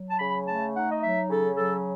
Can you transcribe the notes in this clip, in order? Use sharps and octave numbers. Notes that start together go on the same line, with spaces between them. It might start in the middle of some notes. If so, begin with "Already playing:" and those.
Already playing: F#3
A5
C#3 B5
A3 A5
D#4 F#5
D#5
F#3 E5
C#3 A4
F#3 A4